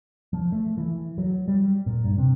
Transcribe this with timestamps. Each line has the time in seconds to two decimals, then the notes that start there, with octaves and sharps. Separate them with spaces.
0.33 F3
0.52 A3
0.77 E3
1.18 F#3
1.48 G3
1.86 A#2
2.05 G2
2.18 C3